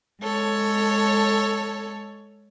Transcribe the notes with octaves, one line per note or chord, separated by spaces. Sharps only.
G#3 A4 C#5